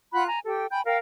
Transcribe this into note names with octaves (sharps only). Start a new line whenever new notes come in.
F4 F#5 B5 F#6
G#5 A#5
G4 A4 G5
G5 G#5 B5 G6
A#4 F5 G5